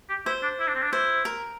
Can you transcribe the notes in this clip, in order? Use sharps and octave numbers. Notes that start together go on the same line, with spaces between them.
G4
E4 C5
D4
E4
D4
C4
D4
E4 C5
A#4